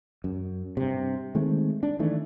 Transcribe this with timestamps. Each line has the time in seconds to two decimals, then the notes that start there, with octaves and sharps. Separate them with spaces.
0.24 F#2
0.77 G2 C3
1.35 D#3 G#3 A3 C4
1.83 D4
1.99 D#3 E3 A3 D4